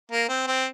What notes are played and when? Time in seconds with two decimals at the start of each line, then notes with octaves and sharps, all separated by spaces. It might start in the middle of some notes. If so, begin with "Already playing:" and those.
0.12 A#3
0.29 C4
0.47 C4